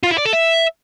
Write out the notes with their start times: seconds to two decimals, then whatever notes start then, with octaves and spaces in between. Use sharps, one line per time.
0.03 F4
0.11 E4
0.18 D5
0.25 A4
0.33 E5